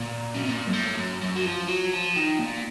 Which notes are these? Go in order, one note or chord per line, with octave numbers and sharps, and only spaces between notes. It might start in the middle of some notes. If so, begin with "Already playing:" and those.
Already playing: A#2
C#3
C3
A#2
F#2
A2
F#2
F#2
F#3
F3
F#3
F3
D#3
A#2